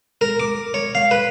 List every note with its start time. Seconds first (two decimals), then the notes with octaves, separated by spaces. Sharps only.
0.21 A#4
0.40 D6
0.74 C#5
0.95 F5
1.11 B4